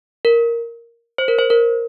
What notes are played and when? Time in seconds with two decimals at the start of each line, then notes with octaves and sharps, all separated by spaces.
0.25 A#4
1.18 C5
1.28 A#4
1.38 C5
1.50 A#4